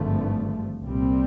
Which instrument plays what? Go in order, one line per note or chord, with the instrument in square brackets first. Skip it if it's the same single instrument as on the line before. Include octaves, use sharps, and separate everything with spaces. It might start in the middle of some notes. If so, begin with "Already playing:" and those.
Already playing: [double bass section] G#1 G2 D3 F3 A3
C2 A#2 G3 C4